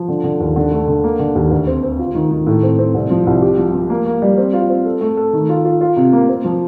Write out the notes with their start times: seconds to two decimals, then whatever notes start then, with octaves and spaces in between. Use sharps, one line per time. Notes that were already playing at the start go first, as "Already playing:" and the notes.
Already playing: F3
0.08 D3
0.24 D3
0.40 D#2
0.56 D3
0.72 A3
0.88 D3
1.04 A#3
1.19 D3
1.35 D#2
1.51 D2
1.67 C4
1.83 C4
1.99 F4
2.15 D#3
2.31 D#3
2.47 A2
2.63 C4
2.79 C4
2.94 C2
3.11 F3
3.27 C2
3.42 G4
3.58 F3
3.74 F3
3.90 A#3
4.06 A#3
4.22 G3
4.38 C4
4.53 F4
4.70 C4
4.85 A4
5.01 A3
5.17 A4
5.33 D#3
5.49 F4
5.65 F4
5.81 F4
5.97 C3
6.13 A#3
6.29 C4
6.45 F3